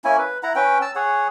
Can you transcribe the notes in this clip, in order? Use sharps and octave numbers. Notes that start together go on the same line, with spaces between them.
A#3 C#4 E4 G#5
B4
E4 F#5 A#5
C#4 B4 G5
A5 E6
G#4 C#5 F#5